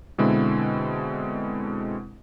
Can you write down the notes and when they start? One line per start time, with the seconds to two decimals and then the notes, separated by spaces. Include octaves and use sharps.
0.18 B2 D3 G#3 C4 E4